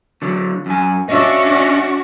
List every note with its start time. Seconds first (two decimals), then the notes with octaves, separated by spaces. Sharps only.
0.22 D3 F#3
0.66 F#2 G#5
1.09 C#4 D4 F#4 D#5 E5